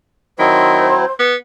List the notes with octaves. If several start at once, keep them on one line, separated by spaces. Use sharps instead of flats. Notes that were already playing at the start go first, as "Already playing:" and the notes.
D#3 F#3 C4 E4 C5
B3